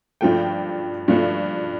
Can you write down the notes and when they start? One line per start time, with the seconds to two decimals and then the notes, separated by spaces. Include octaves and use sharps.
0.21 G2 F3 A3 G5
1.08 G2 F3 A3